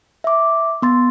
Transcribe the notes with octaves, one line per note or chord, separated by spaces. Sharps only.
E5 D6
B3 C6 A6